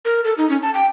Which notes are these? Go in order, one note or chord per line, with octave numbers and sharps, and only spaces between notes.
A#4
A4
D#4
C#4
A5
G5